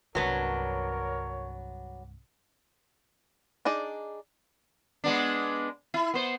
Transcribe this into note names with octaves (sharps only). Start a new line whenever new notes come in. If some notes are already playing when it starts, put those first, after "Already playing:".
C2 G2 F#3 B3 D4 A#4 C#5
D4 D#4 G#4 D5
G#3 B3 D4
E4
B3 C5